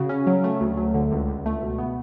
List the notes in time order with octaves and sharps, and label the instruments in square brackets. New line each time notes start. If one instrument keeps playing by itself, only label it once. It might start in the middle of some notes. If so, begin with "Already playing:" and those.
Already playing: [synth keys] C#3 F#4
C#4
F#3
A3
D2
F#3
D3
C#2
C#2
A3
B2
B3